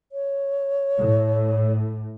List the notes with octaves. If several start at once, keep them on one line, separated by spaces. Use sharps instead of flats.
C#5
A2